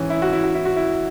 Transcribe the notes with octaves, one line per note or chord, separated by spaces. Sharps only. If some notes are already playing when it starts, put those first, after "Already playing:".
Already playing: G#2 E3 C#4
E4
F#4
E4
F#4
E4
F#4
E4